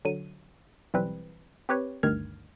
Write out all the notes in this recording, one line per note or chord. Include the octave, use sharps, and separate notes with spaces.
D3 F#3 D#7
B1 E3 G3 C4 B4
C4 G4 B4 C#5
G1 D2 G2 D#3 F6 G#6